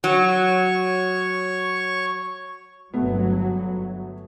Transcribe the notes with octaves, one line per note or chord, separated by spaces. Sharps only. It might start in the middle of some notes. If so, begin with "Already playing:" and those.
F#3 C#5 C#6
G1 F#3 A3 B3